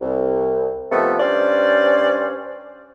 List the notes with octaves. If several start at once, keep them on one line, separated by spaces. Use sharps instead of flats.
C2
C3 D#3 F3 A3 B3
G2 C#4 C5 D5